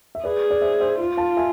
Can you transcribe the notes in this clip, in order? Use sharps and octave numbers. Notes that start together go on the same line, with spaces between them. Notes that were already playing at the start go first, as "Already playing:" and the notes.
E5
G#4 B4 D5
D5
C5 E5
C5 E5
F4
F5 A5
E5 G#5